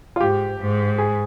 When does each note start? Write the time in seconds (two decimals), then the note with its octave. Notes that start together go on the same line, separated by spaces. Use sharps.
0.16 F4
0.21 G#2 G4
0.59 G#2
0.98 G#4